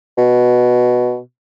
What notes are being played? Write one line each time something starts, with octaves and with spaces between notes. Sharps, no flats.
B2